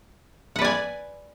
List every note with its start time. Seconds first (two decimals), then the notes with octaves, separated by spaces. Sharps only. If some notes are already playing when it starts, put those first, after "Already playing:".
0.56 F#5
0.59 B4
0.62 D5
0.65 G#5